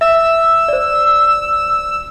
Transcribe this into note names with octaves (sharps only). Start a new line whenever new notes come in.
E5 E6
C5 D5